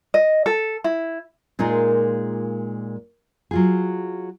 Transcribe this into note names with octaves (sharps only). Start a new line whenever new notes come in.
D#5
A4
E4
A#2 G#3 D#4 F4 G#4 A#4
F#3 F4 G#4